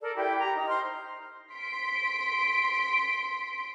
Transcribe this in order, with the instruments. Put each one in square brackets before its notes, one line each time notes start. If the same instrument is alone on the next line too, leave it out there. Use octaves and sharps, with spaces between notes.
[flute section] A4 A#4 D5
E4 G4 G5
G4 A#5
D#4
C5 C6 F6
[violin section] C6 B6 D7